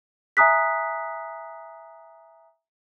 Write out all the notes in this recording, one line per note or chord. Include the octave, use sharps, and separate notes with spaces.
E5 G#5 A#5 D#6 F#6 B6